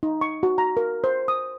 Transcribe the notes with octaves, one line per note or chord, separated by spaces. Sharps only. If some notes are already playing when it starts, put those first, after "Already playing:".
D#4
C#6
F#4
A#5
A#4
C5
D#6